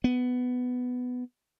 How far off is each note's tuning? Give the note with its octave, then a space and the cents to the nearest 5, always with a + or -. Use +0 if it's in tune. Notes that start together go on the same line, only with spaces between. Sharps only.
B3 +10